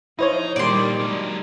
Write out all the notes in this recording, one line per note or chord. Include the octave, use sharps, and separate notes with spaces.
F3 D#4 E4 C5 C#5
A#2 D#3 G3 D4 D5 C6
F#3 G#3